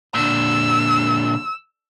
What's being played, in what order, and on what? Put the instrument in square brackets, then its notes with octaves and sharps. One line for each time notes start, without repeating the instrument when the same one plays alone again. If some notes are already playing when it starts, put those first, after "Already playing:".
[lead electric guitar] A#2 D3 [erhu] E6